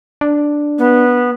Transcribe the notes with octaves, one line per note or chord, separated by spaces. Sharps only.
D4
B3